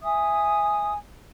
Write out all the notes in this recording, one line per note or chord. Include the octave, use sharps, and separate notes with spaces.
E5 G#5 D#6